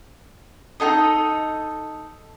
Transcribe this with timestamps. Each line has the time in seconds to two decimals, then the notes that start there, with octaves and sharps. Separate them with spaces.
0.80 D#4 F4 A4 D#5